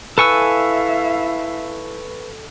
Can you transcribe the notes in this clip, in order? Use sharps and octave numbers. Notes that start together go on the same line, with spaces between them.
E4 A4 B4 E5 F5 G#5 C#6 E6